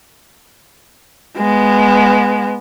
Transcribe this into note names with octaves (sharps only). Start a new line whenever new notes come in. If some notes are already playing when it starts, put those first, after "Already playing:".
G#3 B3